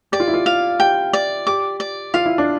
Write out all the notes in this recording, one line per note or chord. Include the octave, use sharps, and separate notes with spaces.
G4 D5
F4
E4
F4
F5
G4 G5
D5
G4 D6
D5
F4 F5
E4
D4